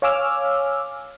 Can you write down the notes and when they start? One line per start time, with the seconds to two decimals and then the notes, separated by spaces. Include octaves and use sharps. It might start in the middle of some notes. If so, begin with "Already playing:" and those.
0.02 C#5 F5 G#5 D6 E6 F6